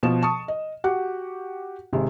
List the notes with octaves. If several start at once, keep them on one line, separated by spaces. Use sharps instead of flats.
B2 F3 E7
A5 C#6 D#6
D#5
F#4 G4 F#5
G#1 C3 G#3